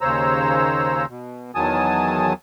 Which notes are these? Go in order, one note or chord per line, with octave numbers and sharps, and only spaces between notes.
D#2 C#3 C5 C#5 A#5 E6
B2
E2 D#3 F#3 G#5 A5 D#6